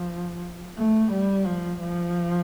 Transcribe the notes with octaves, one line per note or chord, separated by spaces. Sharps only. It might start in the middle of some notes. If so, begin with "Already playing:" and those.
Already playing: F3
A3
G3
F3
F3